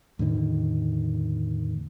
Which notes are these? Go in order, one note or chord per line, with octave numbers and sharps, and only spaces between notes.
E2 A2 D3 D#3